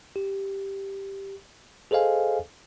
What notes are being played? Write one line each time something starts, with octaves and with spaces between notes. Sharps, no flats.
G4
G#4 A4 C5 D#5 F5 G#5